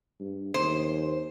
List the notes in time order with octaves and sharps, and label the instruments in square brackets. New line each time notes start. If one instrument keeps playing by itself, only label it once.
[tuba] G2
[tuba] D#2 [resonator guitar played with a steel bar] C5